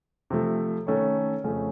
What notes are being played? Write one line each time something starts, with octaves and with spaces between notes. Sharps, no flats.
C3 F3 A3
D#3 A3 C#4 A4 C#5
F2 C#3 A3 C#4